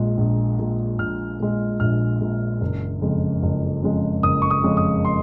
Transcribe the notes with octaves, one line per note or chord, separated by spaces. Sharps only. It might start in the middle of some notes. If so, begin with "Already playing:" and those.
Already playing: A#1 A#2 G#3
A#1
A#2 G#3
A#1 F6
A#2 G#3
A#1 F6
A#2 G#3
F#1
F2 C#3 G#3
F#1
F2 C#3 G#3
F#1 D#6
C#6
D#6
F2 C#3 G#3
D#6
C6